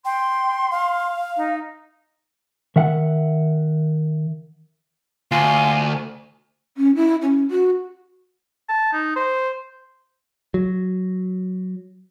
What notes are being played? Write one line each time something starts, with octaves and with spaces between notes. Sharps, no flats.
G5 C6
F5
D#4
D#3 E5 F#5
D2 F4 G#5
C#4
E4
C#4
F#4
A5
D#4
C5
F#3